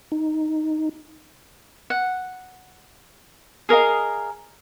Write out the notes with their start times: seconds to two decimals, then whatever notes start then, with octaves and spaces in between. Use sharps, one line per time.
0.12 D#4
1.90 F#5
3.69 G#4 A#4 D#5 F5